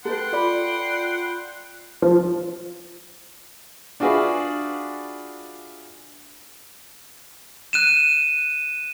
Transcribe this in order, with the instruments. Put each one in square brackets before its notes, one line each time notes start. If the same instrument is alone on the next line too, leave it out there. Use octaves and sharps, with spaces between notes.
[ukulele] A4 B4 [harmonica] F#5 G5 C6
[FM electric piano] F4 D5 B5
[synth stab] F3
[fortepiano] D4 F4 F#4 G#4 B4 E5
[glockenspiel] F#6 D#7 E7